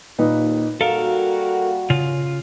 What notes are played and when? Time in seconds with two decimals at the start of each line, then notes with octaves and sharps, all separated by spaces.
0.18 D#2 A#2 D#4 B4
0.81 G3 A#3 F#4 A4 A#4 F5
1.90 C#3 F4